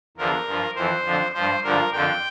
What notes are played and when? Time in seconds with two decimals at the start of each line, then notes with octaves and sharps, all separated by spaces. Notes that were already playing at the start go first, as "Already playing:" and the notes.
0.17 E2 D3 F3 A#4
0.47 G2 F3
0.76 F2 E3 C5
1.05 F2 D3 F3
1.34 G2 F3 C5
1.63 G2 D3 F3 A#4
1.92 F2 D3 F3 G5